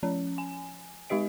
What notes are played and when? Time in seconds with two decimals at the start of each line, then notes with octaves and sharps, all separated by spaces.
0.03 F3 C#4
0.38 G#5
1.10 G#3 D#4 G4 D#5 D7